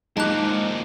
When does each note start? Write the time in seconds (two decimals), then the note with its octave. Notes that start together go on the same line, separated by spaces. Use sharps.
0.17 D#2 F3 G#3 D#4 A5 D6 F#6